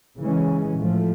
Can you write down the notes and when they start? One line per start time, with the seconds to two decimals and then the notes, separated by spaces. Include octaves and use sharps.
0.19 C#3 E3 G#3 C#4
0.79 A2 F3 A3